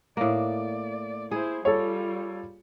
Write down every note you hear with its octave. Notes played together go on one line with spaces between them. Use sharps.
A2 A#3 D5
E4 G#4 C5
G3 F4 A4 C#5